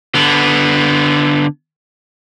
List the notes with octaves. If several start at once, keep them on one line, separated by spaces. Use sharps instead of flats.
D3 B3